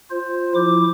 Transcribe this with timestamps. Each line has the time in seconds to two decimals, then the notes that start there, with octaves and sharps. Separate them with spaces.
0.10 F4 C5
0.55 F3 E4 D6